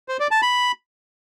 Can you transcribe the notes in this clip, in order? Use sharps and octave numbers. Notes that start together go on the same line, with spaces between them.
C5
D5
A5
B5